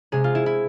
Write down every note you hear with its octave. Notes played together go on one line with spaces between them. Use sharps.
C3 G#3 G#4
F4
E4
E4